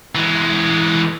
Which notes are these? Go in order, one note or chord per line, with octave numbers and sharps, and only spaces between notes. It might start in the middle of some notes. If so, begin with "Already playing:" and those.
E3 G#3